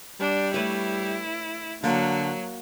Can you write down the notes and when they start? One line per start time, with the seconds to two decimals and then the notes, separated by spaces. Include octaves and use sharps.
0.20 G3 D4
0.54 A3 E4 B4 C#5
1.84 D3 F#3 A#3